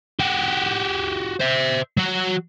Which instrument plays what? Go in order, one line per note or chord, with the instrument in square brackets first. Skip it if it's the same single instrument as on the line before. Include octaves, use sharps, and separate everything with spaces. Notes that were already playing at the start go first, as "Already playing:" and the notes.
[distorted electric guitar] F#4 G4
C5 E5
F#3 F#4